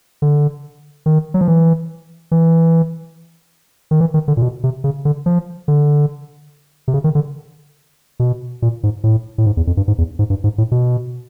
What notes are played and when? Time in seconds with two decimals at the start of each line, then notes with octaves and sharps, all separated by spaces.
0.22 D3
1.06 D#3
1.34 F#3
1.41 F3
1.48 E3
2.31 E3
3.91 D#3
4.00 E3
4.14 D#3
4.28 D3
4.37 A#2
4.42 B2
4.64 C3
4.84 C#3
5.05 D3
5.26 F3
5.68 D3
6.88 C3
6.94 C#3
7.04 D#3
7.15 D3
8.20 B2
8.62 A#2
8.83 G#2
9.04 A2
9.38 A2
9.46 G#2
9.57 E2
9.67 F2
9.77 G2
9.88 G#2
9.98 E2
10.19 G#2
10.30 G2
10.44 G#2
10.58 A2
10.72 B2